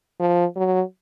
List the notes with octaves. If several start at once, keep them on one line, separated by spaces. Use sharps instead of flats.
F3
F#3